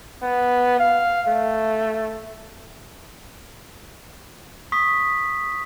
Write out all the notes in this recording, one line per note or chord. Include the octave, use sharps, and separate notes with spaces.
B3
F5
A3
C#6 D#6 B6